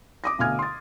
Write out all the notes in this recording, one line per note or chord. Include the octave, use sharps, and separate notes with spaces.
D6 D#6 A#6
D2 B2 F5 G#5 F6 G#6
C6 A6